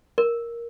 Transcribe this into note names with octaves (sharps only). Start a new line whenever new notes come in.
A#4